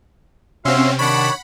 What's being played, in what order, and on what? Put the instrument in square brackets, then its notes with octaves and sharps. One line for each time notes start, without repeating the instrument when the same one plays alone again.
[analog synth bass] C3 [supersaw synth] C4 C#4 [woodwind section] F#4 F5 [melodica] E5 C6
[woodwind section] D#3 D4 [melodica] C#5 [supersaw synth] F#5 B5